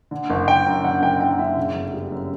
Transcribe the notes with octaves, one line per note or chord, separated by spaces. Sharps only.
D3
F#1
F#1 G5
F#2
D3 F#5
F#1 G5
F#1 G5
F#2 E5
C#3
G1
G3
F#2